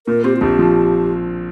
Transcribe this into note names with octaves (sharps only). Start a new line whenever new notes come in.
A#2 A#4
C4 G4
F4
A#1 G4
F3